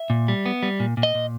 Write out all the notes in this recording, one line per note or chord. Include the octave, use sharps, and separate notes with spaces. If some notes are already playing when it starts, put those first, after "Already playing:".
Already playing: E5
A#2
G3
B3
G3
A#2
A#2
D#5
A#2